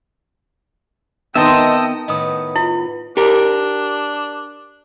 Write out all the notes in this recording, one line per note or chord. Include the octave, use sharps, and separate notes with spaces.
D#3 B3 C4 D#4 D#5 E5 G5 A5
A2 D#3 B3 D#5 D#6
E4 F4
D4 G4 A#4